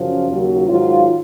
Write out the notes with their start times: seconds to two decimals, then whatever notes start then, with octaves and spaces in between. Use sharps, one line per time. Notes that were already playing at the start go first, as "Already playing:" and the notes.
Already playing: F#2 C#3 F3 F4
0.29 D#2 C#3 F#3
0.67 G#2 D#3 F#3 F4